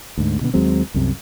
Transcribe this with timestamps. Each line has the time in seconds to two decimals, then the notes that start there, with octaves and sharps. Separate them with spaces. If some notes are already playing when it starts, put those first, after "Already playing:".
0.18 D2 G#2
0.41 B2 D3 B3
0.54 D#2 F#3 G#3 C4
0.94 C2 F#2 C3